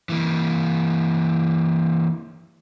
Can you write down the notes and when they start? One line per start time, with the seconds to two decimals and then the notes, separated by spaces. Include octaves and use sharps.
0.09 E3 A#3